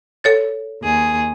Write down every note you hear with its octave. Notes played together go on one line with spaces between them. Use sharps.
A4 C#5 A6
D#2 G#4